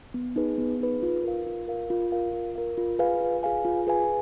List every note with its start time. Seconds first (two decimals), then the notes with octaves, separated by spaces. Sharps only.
0.14 B3
0.36 D#4 G#4 B4
0.58 B3
0.80 D#4 G#4 B4
1.03 F4
1.24 A#4 F5
1.46 F4
1.68 A#4 F5
1.90 F4
2.12 A#4 F5
2.33 F4
2.55 A#4 F5
2.78 F4
2.99 G#4 B4 F5 G#5
3.21 F4
3.43 G#4 B4 F5 G#5
3.65 F4
3.87 G#4 B4 F5 G#5